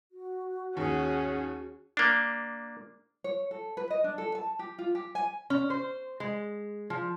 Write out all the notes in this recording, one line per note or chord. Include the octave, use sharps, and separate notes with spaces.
F#4
D#2 C#4 G#4 F#5
A#3 D4
C#5
A4
B4
D#5
D4
A4
A5
G4
F4
G4
G#5
C#4
C5
G#3
F3